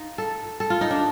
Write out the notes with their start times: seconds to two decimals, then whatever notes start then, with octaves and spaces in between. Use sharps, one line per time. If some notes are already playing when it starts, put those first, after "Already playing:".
Already playing: D#4 F4
0.18 A4
0.60 A4
0.70 F4
0.81 D#4
0.91 D4